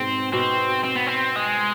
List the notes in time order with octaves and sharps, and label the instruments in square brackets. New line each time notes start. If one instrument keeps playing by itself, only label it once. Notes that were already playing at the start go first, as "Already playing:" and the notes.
Already playing: [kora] G#2 B2 [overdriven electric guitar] C4
[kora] B2 [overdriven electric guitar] C4
[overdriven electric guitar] C4
B3
C4
G#3